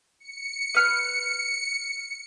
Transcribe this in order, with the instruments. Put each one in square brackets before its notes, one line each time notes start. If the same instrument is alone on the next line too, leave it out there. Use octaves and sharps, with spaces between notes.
[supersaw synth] C#7
[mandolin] B4 F6 F#6